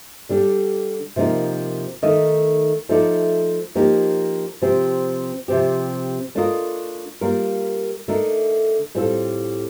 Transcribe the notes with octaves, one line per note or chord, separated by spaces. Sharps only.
D3 G3 D4 G4
C3 F3 A#3 D#4 A#4
D#3 A3 D#4 A#4 D#5
F3 A3 D#4 A4 D5
F3 A#3 D#4 G4
C3 F3 C4 G4
C3 F3 C4 G4
A3 D4 F4 A#4 D#5
G3 A#3 F4 A#4
D3 A3 D#4 A#4
A2 G3 C4 F4 A4